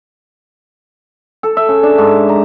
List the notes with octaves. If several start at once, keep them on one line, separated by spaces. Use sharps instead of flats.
A4
E5
C#3
D4
G#2
A#5